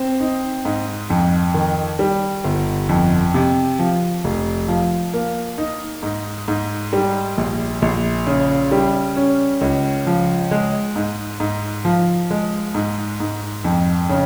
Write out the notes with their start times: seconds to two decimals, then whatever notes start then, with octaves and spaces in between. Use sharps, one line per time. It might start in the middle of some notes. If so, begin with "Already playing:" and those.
Already playing: C4
0.20 D#4
0.65 G#2
1.10 F2
1.54 D#3
1.99 G3
2.44 G1
2.89 F2
3.34 C3
3.79 F3
4.24 F1
4.68 F3
5.13 A#3
5.58 D#4
6.03 G#2
6.48 G#2
6.93 G3
7.38 A#1
7.82 A#1
8.27 C#3
8.72 G3
9.17 C#4
9.61 C#2
10.07 F3
10.51 G#3
10.96 G#2
11.40 G#2
11.85 F3
12.31 G#3
12.75 G#2
13.20 G#2
13.65 F2
14.09 C#3